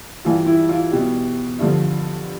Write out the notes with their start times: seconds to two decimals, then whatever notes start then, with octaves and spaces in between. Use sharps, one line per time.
0.24 G2 E3 G3 F4
0.46 E4
0.69 F4
0.92 B2 G3
1.59 G2 D3 F3